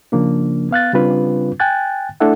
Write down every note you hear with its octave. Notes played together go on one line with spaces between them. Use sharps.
C#3 F3 A#3 D4
B3 F5 F#6 A6
C#3 G3 C4 D4 F4 B4
G5 G#5 F#6 A6
A3 D4 E4 A4 E5 F#5